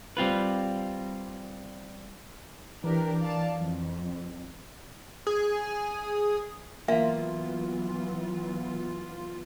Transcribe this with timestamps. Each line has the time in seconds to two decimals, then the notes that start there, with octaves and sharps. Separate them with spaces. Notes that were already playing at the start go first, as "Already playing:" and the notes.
0.17 G3 C4 F4 B4
2.84 E3 D4 G4 A#4
3.20 D5 F5 A5
3.57 F2
5.27 G#4
6.88 E3 F#3 A#3 B3 F4 E5 F5